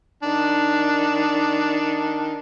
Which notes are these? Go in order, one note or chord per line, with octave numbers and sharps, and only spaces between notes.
D#3 D4